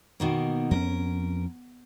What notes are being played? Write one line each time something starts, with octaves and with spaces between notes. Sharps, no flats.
B2 D#3 A#3
F2 A#3 C#4 A#4